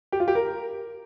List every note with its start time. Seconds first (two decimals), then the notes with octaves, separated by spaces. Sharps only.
0.12 G4
0.20 F4
0.28 G4
0.35 A#4